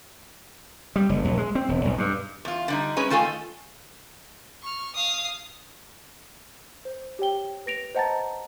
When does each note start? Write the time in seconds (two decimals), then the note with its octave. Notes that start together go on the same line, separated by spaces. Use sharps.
0.96 G3
1.09 F#1
1.25 A#1
1.38 G#3
1.55 C4
1.69 E1
1.85 B1
1.98 G2
2.45 E2 F4
2.68 D3 G3 D#4
2.97 G#3 C#4 B4
3.10 D#3 A3 F4 A4 G#5
4.63 C#6 F6
4.95 F5 D#6
6.85 C5
7.19 G4 C#5 G5 G7
7.66 B4 A#6 D7 F7
7.95 C5 D#5 F#5 A5 A#5 A6